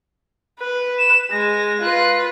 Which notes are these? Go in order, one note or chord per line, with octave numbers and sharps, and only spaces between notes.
B4
E7
G#3 A#6
F4 B4 F#6